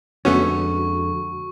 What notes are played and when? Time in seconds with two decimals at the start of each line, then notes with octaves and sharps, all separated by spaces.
0.25 F2 D3 G#3 A3 B3 C#4 F#4 C#6